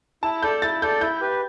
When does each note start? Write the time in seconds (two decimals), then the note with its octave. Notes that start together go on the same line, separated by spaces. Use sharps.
0.23 E4 A5
0.43 A4 D5 G6
0.62 E4 A6
0.82 A4 D5 G6
1.01 E4 G6
1.21 G4 B4